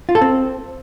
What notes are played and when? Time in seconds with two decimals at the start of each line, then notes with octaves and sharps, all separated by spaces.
0.09 F4
0.15 A4
0.21 C4